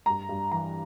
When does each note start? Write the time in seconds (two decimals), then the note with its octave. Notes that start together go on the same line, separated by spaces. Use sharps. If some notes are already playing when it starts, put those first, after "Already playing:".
0.06 G2 A#5
0.29 G2
0.52 E3 A#5